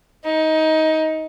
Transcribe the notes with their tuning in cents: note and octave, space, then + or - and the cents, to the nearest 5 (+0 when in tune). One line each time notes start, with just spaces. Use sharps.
D#4 +20